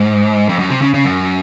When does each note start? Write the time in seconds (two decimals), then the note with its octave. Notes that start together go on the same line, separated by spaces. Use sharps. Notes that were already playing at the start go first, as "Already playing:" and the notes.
Already playing: G#2
0.49 F2
0.59 F#2
0.70 C3
0.81 C#3
0.94 C#3
1.05 F#2